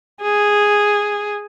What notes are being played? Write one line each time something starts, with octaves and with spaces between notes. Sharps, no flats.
G#4